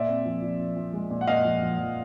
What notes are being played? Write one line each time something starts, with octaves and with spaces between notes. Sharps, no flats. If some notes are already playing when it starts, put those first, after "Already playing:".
Already playing: A#2 D5 E5
C4
F3
F3
F3
F3
G#3
A#2
F#5
A#2 D#5 F5
F3
F3
F3